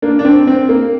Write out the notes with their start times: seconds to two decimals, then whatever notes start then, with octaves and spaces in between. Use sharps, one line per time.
0.02 A#3 D4
0.19 D4
0.25 C4
0.47 C4
0.69 A#3